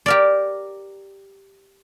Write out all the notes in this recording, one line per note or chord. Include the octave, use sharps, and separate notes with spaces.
G4 A#4 D5